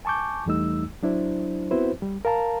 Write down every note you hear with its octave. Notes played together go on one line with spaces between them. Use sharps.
G#5 A5 C#6 D6 G6
E2 E3 G3 A3 D#4 E6
F#3 D4 E4 C5
B3 C4 E4 F#4 B4 C5
G3
A#4 F5 A5 A#5